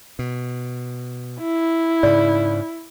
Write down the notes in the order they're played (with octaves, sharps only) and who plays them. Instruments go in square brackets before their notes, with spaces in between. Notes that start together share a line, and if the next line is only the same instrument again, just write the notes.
[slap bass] B2
[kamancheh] E4
[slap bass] G#2 C#3 [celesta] D5